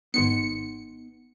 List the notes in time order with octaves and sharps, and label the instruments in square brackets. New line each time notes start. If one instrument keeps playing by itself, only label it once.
[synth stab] G#1 C#7 [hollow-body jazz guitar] B3 D#4 C6